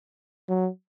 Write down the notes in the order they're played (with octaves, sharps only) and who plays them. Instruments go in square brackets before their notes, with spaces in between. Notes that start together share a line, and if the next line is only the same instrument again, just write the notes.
[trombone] F#3